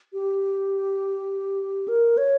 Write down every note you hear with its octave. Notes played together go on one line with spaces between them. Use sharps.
G4
A#4
C#5